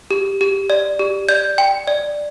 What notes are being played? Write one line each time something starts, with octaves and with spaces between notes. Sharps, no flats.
G4
G4
D5
G4
D5 G6
G5
D5